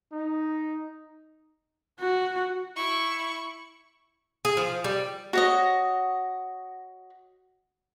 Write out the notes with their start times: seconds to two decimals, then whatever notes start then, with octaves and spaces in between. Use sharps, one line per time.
0.12 D#4
2.00 F#4
2.76 E4 C#6
4.45 G#4
4.57 F3
4.84 G3
5.33 F#4 C#5 D#5